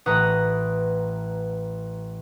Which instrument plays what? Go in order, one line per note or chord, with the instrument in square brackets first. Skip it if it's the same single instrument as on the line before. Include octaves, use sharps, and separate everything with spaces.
[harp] A1 B4 F#5 A#5 D#6 F#6